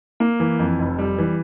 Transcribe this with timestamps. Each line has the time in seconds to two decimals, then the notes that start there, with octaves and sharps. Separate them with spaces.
0.20 A#3
0.40 E3
0.59 F2
0.79 F1
0.99 G3
1.18 E3